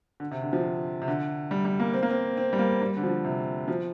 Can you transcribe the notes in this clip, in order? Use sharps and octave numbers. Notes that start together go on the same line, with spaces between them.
D3
C3
D3
F3
C3
D3
G3
G3
A#3
C4
A#3
C4
C4
G3
A#3
G3
D3
F3
C3
F3